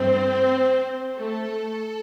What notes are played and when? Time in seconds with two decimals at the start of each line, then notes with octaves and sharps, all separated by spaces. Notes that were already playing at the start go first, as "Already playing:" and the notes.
Already playing: G2 E3 A3 C4 C5
1.17 A3 A4